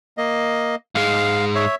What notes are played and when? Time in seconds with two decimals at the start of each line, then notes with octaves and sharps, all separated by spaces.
0.17 A#3 D#5
0.95 G#2 G#3 F5
1.55 C#5 E5